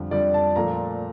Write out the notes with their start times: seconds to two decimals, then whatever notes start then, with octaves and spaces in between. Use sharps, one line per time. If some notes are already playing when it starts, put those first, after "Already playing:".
Already playing: F2 D3 G3
0.11 F2 D3 G3 D5
0.34 A5
0.56 A#2 F3 A3 A#5